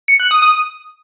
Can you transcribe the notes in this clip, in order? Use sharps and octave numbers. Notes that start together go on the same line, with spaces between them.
C#7
F#6
D#6
D#6